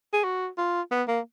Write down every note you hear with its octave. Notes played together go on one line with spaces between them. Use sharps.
G#4
F#4
F4
B3
A#3